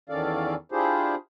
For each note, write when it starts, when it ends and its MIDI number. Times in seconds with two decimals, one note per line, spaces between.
0.09 0.54 40
0.09 0.54 51
0.09 0.54 61
0.09 0.54 69
0.09 0.54 74
0.09 0.54 77
0.72 1.15 62
0.72 1.15 64
0.72 1.15 65
0.72 1.15 67
0.72 1.15 68
0.72 1.15 72